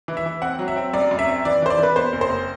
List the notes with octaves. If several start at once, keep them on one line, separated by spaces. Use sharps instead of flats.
E3
E5
E3
C4 F#5
F#3
E5
C4
F#2 D5
F#2
E5
C4
E3 D5
E3 C5
D5
E3 B4
B3 C5
F#1
C5
F#1